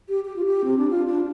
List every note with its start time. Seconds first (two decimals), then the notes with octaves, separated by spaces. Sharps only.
0.09 G4
0.25 G4
0.36 F4
0.45 G4
0.64 C4
0.77 D4
0.90 F4
1.07 D4